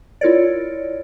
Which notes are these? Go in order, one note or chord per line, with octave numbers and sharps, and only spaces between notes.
E4 F4 A#4 C#5 D5